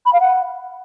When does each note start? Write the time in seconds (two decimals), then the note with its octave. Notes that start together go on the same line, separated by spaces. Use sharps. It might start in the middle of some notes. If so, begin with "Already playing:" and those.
0.06 B5
0.13 F5
0.20 F#5